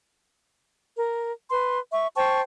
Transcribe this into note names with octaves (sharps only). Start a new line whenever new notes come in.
A#4
B4 C6
E5 C#6
C5 G5 A5 C#6